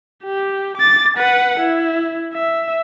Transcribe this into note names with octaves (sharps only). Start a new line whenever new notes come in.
G4
D6 A6
B4 F#5
E4
E5